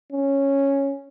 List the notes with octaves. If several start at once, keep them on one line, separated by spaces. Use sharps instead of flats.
C#4